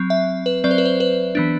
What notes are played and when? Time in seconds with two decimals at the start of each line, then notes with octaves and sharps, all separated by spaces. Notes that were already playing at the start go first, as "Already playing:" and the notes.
Already playing: F#3 C4
0.10 E5
0.46 B4
0.64 F#3 C4 D5
0.71 C5
0.78 B4
0.86 C5
1.00 B4
1.35 E3 B3 D4